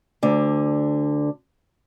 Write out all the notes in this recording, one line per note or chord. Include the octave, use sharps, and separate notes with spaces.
D2 D3